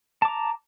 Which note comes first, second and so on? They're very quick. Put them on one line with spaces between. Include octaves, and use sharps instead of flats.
A5 D6 A#5